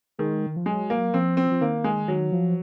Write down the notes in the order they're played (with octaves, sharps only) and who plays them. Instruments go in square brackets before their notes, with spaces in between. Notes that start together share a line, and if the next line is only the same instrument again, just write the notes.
[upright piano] D#3 [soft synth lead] G#3
[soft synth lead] D#3
F3
[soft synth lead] F#3 [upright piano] G#3
[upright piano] A#3
[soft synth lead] F3 [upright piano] C4
[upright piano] C4
[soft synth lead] F3
[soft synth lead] D#3 [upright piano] A#3
[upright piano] G#3
[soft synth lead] D#3 [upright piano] F#3
[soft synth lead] F3